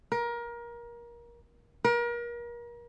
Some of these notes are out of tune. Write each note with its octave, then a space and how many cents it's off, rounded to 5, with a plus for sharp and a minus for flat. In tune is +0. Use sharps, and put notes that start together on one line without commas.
A#4 +25
A#4 +35